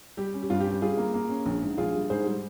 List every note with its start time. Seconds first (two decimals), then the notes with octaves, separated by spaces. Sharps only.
0.17 G3 G4
0.34 C#4
0.42 G4
0.50 G2 F4
0.60 G4
0.65 C#4
0.71 G4
0.82 G3 F4 G#4
0.97 A#3
1.14 A#3
1.30 C#4
1.46 A#1
1.62 G#2
1.78 A#1 F4 G#4
1.94 G3
2.10 G#2 G#4 C5
2.26 G3